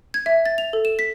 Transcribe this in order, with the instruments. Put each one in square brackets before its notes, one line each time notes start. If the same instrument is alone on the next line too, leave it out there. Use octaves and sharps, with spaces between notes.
[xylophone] G#6
E5
A6
F7
A4
E7
B6